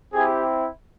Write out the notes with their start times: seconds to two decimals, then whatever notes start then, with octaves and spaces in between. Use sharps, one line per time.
0.13 C4 E4 G4 G#4